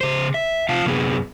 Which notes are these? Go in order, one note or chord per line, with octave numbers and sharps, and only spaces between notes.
C#3 C5
E5
C3 F4 F5 A5
F#2 C3 B3 G#4